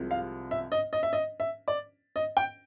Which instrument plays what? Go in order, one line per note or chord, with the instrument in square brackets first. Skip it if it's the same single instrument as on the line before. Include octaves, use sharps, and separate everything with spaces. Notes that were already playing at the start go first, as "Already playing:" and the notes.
Already playing: [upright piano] C2 C3 F3 G#3
F5
E5
D#5
D#5
E5
D#5
E5
D5
D#5
G5